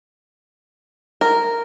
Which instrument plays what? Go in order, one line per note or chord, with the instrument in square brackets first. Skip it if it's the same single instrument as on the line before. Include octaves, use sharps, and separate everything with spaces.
[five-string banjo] A#4